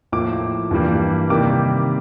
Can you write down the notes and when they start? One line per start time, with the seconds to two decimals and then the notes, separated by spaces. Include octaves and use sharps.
0.12 A2 F3 A#3 D6
0.71 G2 E3 G3 A#3
1.29 C3 D#3 G3 A#3 D6